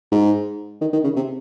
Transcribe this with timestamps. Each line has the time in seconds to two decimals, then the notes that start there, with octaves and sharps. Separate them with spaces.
0.12 G#2
0.81 D#3
0.93 D#3
1.04 C#3
1.16 C3